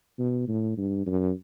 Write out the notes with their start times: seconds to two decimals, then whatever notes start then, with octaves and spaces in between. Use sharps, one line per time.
0.19 B2
0.48 A2
0.77 G2
1.06 F#2